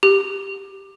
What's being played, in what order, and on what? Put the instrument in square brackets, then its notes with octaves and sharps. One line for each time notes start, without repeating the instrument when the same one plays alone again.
[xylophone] G4